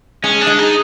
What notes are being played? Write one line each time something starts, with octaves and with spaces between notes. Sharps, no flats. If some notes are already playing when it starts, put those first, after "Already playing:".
G#3 C#4
D4
G#3
D#4